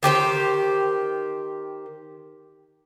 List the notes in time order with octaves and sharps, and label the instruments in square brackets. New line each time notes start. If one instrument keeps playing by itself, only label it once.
[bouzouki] D#3 G4 B4 C5